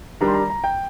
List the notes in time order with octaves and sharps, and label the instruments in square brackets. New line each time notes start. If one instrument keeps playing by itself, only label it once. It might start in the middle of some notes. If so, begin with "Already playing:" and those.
[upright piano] D#3 G3 D4 G4 [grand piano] A#5
[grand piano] C6
A#5
A#5
G5